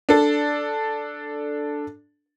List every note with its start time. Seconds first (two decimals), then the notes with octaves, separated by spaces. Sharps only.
0.09 D4 A4